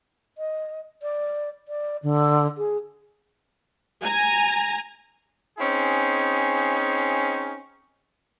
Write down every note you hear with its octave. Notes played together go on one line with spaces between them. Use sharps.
D#5
D5
D5
D3
G#4
G#5 A#5
C4 C#4 D#4 G#4